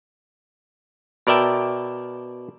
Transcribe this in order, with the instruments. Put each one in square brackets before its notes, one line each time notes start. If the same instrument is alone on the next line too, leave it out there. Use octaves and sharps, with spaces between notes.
[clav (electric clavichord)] B2 A#4 D5 E5 G5 A5